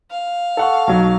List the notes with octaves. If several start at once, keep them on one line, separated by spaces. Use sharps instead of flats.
F5
A4 F#5 C#6
B1 F#3